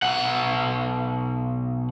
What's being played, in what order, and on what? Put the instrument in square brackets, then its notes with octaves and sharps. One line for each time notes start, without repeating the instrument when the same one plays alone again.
[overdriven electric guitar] B1 F#5